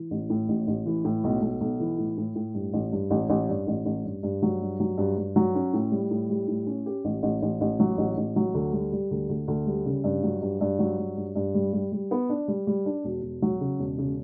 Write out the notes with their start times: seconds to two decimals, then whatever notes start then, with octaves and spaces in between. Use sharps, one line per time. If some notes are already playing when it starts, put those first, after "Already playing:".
Already playing: E3
0.11 A1
0.30 A2
0.49 A1
0.67 A1
0.86 E3
1.04 A2
1.24 B1
1.42 B1
1.61 B1
1.80 E3
1.98 A2
2.17 A2
2.35 A2
2.55 G2
2.73 A1
2.92 G2
3.10 A1
3.29 A1
3.49 G2
3.67 A1
3.85 A1
4.04 G2
4.23 G2
4.42 F#3
4.61 G2
4.80 F#3
4.98 G2
5.17 G2
5.36 F#3
5.55 C#4
5.73 A2
5.92 G3
6.11 A2
6.30 G3
6.48 A2
6.67 C#4
6.86 G4
7.05 A1
7.23 A1
7.42 A1
7.61 A1
7.80 F#3
7.98 A1
8.17 A1
8.36 F#3
8.54 D2
8.73 G3
8.92 G3
9.11 D2
9.29 D2
9.48 D2
9.67 G3
9.86 C#3
10.04 G2
10.23 F#3
10.42 G2
10.61 G2
10.79 F#3
10.99 G2
11.17 G2
11.35 G2
11.55 G3
11.73 G3
11.92 G3
12.11 B3
12.29 D4
12.48 G3
12.67 G3
12.86 D4
13.04 E1
13.23 E1
13.42 F#3
13.61 C#3
13.79 E1
13.98 C#3